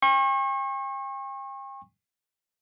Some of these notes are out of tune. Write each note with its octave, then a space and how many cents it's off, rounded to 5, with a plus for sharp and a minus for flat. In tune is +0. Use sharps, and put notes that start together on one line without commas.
G5 +40 C#6 -35